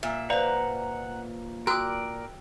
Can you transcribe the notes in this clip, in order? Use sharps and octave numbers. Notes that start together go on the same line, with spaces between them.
A#2 E5
B4 C5 D5 F5 F#5 A#5
F#4 A#4 D5 G5 D#6 E6 F#6